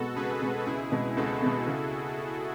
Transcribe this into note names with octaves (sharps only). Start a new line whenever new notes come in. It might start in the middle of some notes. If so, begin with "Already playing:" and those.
Already playing: B2 G#3 B3 F#4 A4
C#2 G#4 B4
B2 G#3 B3
C#2 E4 G#4
B2 G#3 B3
C#2 F#4 A4
B2 G#3 B3
C#3